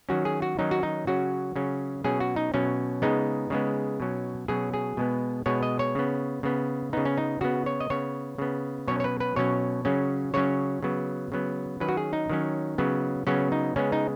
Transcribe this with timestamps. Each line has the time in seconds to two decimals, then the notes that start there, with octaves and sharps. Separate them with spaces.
0.09 D#3 F#3 C#4 F#4
0.25 G#4
0.42 F#4
0.59 D#3 F#3 C#4 D#4
0.71 F#4
0.83 D#4
1.07 C#3 F#3 C#4 F#4
1.56 C#3 F#3 C#4
2.04 B2 F#3 C#4 G#4
2.20 F#4
2.36 D#4
2.54 B2 F#3 C#4
3.02 C#3 G#3 B3 D#4
3.50 C#3 G#3 B3
4.00 B2 F#3 C#4
4.48 B2 F#3 C#4 G#4
4.74 G#4
4.97 B2 G#3 B3
5.46 B2 G#3 B3 C#5
5.63 D#5
5.79 C#5
5.95 C#3 B3
6.43 C#3 B3
6.93 C#3 B3 D#4
7.05 C#4
7.17 D#4
7.41 C#3 B3 F#4
7.66 C#5
7.80 D#5
7.90 C#3 B3 C#5
8.38 C#3 B3
8.88 B2 F#3 C#4 C#5
9.00 C#5
9.04 B4
9.20 B4
9.36 B2 F#3 C#4 C#5
9.85 C#3 F#3 C#4
10.34 C#3 F#3 C#4 C#5
10.83 C#3 F#3 B3
11.32 C#3 F#3 B3
11.80 D#3 F#3 C#4 B4
11.89 F#4
11.97 G#4
12.13 D#4
12.30 D#3 F#3 C#4
12.78 C#3 F#3 B3
13.27 C#3 F#3 B3 C#4
13.52 D#4
13.76 C#3 G#3 B3 C#4
13.92 D#4